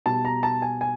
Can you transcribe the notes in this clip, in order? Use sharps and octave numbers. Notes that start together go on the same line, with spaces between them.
B2 G3 A5
A#5
A5
G#5
G#5